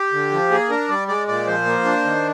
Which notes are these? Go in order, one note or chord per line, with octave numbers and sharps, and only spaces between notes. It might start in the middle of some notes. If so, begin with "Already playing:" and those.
Already playing: G4
D3
F3
A#3 G#4
D4 A#4
G3 D5
G#3 D5
A#2 D5
F3 C5
A#3
D4
D#3